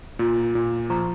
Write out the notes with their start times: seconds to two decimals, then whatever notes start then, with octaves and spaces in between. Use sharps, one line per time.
0.19 A#2 F4
0.42 F4
0.55 A#2
0.90 F3 A#5 C#6